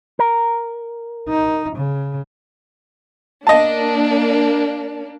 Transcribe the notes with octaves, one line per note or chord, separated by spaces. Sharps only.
A#4
D#4
C#3
A#3 D4 D#5 A5